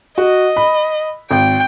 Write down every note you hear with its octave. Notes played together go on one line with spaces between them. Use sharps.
F#4 D#5
B5
G#1 G5